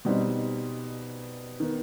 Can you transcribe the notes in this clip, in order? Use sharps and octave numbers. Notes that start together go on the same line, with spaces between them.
B2 G3 C4 D#4
D#3 B3